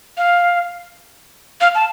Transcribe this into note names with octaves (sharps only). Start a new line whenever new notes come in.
F5
F5
A5